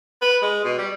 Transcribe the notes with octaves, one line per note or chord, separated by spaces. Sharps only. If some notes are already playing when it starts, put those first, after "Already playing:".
B4
G#3
B2
G3